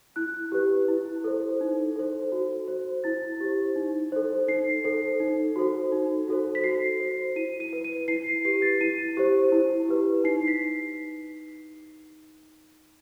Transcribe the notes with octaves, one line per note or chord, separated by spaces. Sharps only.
E4 F#6
G4 B4
E4
A4 C5
D#4
A4 C5
F#4
C5
E4 A6
G4 C5
D#4
A4 C5
D#4 C7
A4 C5
D#4
F#4 A4 C5
D#4
F#4 A4 C5
B6
F#4 C7
C5
E4 D#7
D#7
B4
D#7
E4 C7
C7
G4 B4 C7
A6
E4 D#7
G4 C5
E4
G4 B4
D#4 C7
B6